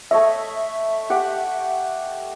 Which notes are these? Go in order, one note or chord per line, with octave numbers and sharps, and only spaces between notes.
A3 C#5 D#5 E5
G4 F#5